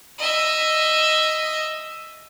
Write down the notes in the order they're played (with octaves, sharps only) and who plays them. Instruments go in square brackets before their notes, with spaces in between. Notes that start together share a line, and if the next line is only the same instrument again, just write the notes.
[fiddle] D#5 E5